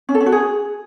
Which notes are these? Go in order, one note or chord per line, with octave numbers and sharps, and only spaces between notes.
C#4
A4
C#4
F#4
G#4